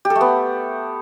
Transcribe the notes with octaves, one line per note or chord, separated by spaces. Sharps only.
G4
A4
A3
B3